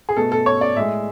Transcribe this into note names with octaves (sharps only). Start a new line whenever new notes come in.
G#4
B2 A3 A4
A4
C#5
D5
A2 G#3 E5